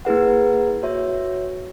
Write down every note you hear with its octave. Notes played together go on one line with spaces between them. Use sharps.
A#3 E4 G#4 B4 F#5
F#4 C#5 E5